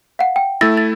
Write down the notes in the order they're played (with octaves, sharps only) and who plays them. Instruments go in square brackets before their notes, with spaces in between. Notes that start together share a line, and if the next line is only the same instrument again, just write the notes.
[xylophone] F5 F#5
G5
[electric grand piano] A3 E4 [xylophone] E6 A6 A#6
[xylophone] A6